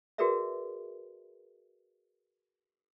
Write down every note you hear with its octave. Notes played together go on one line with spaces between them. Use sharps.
F#4 G#4 A#4 B4 D5 E5